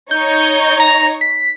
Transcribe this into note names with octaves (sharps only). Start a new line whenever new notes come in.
D#4 C#5 G6
A#5
B6